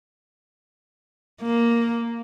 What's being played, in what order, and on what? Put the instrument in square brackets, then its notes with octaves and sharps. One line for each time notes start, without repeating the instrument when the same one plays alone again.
[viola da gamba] A#3